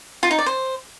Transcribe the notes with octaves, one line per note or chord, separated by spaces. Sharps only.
F4
D#4
D5
C5